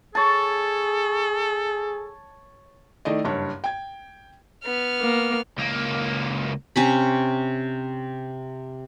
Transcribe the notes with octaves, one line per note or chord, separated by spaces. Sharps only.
G#4 A4 C#5 A5
D#3 A3 E4 D5 D#5
F#1 G2 C#5
G5 G#6
B3 F6
A#3
C#2 A#3
C3 C#4 B5